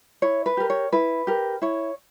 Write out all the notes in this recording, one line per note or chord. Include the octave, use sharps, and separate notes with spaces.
E4 C#5
B4
G4 A#4
C#5
E4 B4
G4 A#4
E4 C#5